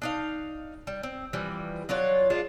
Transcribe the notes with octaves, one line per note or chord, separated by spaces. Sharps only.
D4 D#4 F5
G3
C4
E3 F3 G3
F#3 D4 F4 C#5
G#3 D4 F4